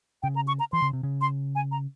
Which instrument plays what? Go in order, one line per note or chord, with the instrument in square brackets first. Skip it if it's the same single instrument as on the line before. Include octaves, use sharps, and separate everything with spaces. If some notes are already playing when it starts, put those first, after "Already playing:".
[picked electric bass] C#3 [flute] G5
[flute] A#5
C#6
A#5
[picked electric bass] E3 [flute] C6
[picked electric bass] C#3
C3
C#3
[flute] C6
G#5
A#5